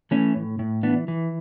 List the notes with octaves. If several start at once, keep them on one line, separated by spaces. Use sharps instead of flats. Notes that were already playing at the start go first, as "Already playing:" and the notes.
E3 A3 C#4
A2
A2
E3 B3 D4
E3